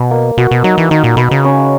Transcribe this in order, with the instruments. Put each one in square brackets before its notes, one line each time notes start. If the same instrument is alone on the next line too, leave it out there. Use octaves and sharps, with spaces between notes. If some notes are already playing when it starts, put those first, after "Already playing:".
Already playing: [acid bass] B2
[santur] A#3
[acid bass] B2 [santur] F#4
[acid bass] B2
[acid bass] F#3 [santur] D#4
[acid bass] E3
[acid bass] D#3 [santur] D#4
[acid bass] A#2
[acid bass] B2 [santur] B4
[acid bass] C#3
[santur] C#4